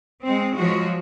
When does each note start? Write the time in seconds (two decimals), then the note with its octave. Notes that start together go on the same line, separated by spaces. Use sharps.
0.25 G#3 C4
0.58 F3 F#3 G#3 F#4